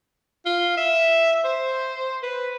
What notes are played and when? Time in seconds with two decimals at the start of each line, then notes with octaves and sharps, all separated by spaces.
0.46 F4
0.77 E5
1.44 C5
2.22 B4